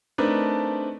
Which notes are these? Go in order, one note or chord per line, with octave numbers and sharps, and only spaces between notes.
A3 C4 D4 D#4 A#4 B4